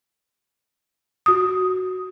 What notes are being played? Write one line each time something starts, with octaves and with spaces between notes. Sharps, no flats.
F#4 D#6